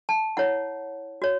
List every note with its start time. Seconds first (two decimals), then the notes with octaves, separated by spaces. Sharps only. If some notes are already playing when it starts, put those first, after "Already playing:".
0.09 A5
0.37 E4 C#5 F#5
1.22 F#4 C#5